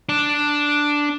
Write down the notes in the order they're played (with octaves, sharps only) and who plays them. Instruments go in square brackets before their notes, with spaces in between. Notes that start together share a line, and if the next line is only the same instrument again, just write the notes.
[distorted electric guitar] D4